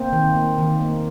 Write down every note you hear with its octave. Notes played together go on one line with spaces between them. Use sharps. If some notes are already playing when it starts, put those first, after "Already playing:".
Already playing: A#3 C4
D#3
A#3
D#3
A#3